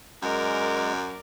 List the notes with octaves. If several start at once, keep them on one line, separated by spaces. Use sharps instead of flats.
F#2 G#3 A#4 D5